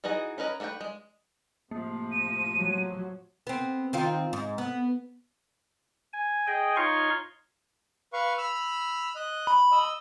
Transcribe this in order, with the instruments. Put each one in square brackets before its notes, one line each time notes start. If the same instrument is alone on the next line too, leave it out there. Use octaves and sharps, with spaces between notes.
[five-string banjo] E3 D#4 F#4 G#4 D#5
C#4 A#4 B4 D#5
A3 D4 B4 D5 G5
G#3
[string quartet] A2 C3 F3 [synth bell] A#3
[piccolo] D#7
[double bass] F#3
[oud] B3 C4
D#3 C4 F4
G#2
B3
[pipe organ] G#5
G#4 D#5 G5
D#4 F4 C#5 F5 C6 C#6
[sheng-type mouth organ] B4 F5 C#6
B5 E6 F6
D#5 F#6
[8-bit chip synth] B5
[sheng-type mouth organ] D#5 E6